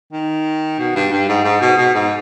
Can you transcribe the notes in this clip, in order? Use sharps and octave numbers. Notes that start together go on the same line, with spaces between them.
D#3
B2
G2
G2
G#2
G#2
B2
B2
G#2